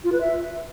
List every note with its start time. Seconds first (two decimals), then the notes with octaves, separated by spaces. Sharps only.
0.04 F4
0.12 B4
0.21 E5